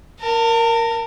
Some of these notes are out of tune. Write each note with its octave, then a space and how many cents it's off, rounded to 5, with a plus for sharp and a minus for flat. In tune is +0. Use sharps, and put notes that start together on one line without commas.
A#4 +0 A5 +40